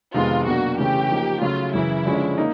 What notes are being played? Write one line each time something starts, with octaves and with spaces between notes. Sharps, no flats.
F2 C3 D#3 G#3 B3 F4
B2 F#3 A#3 D4 F#4
C#3 E3 A3 C#4 G4
F3 A#3 D#4
C#3 F#3 A3 C#4 F4 F#4
F#2 C#3 E3 E4
D3 F3 G#3 C#4
A#3 D#4